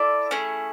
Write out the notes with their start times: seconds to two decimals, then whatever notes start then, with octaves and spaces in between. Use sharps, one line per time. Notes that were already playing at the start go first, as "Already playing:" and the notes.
Already playing: E4 A4 D5
0.31 A3 C#4 E4 G#4